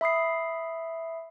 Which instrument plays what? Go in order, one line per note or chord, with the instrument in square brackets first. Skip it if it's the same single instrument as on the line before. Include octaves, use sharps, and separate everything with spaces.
[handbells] E5 B5 D#6 C7